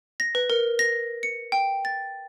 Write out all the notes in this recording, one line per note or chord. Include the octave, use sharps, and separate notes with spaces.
A#6
B4
A#4
A#6
C#7
G5
A6